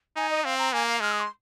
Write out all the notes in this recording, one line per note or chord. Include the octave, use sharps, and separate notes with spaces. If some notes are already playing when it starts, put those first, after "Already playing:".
D#4 G#5
D#5
C4 F5
A#5
A#3 G#5
F5
G#3 F6
D#6
C6